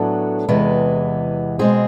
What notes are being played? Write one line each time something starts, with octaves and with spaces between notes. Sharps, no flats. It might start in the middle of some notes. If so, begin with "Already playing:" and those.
Already playing: A2 F#3 B3 D4 A4
E2 C3 E3 G#3 B3
B2 G#3 C4 G#4